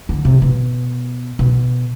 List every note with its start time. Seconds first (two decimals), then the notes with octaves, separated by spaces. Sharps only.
0.09 D3
0.25 C3
0.42 B2
1.39 B2